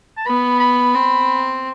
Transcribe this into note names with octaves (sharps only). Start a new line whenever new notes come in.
A5
B3 B5
B5
C4